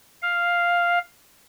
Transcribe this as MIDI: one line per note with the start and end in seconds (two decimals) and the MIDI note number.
0.22 0.98 77